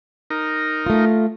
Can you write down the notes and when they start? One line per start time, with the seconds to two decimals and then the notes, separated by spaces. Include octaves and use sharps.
0.30 D#4 A#4
0.86 A3 F4